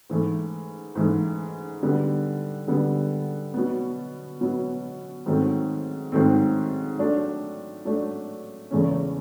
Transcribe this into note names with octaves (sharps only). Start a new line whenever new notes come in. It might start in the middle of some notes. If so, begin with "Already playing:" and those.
G#2 E3 A3
G#2 E3 A3
D3 G3 B3
D3 G3 B3
B2 F#3 B3
B2 F#3 B3
G#2 D#3 F#3 A3 C4
G#2 D#3 F#3 A3 C4
F#3 A3 D4
F#3 A3 D4
E2 C#3 E3 A3 C#4